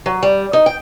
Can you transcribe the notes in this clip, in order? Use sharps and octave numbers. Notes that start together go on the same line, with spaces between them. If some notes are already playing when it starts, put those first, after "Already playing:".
F#3
G3
D#4
G5